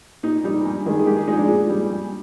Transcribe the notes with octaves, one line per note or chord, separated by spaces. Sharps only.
A#2 D#4
G3 D#4
G2
D#3 G#3
G#4
G#2 G4
G#4
F3 G#3 D#4
D4
A#2 G#4
G3
G2